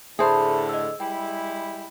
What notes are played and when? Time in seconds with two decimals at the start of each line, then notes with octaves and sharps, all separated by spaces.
0.19 A2 D3 G#4 C5 E5 A5 B5
0.69 D#5 E6
1.00 G3 G#3 E4 G5